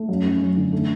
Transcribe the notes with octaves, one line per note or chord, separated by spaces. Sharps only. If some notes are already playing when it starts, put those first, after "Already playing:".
Already playing: A3
F#2
C#4
F#2
D3
A3